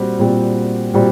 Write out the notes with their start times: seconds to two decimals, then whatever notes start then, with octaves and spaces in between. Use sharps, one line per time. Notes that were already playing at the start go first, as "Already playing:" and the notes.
Already playing: A#2 G3 C4 F#4
0.19 A#2 G3 C4 F#4
0.93 A#2 G3 C4 F#4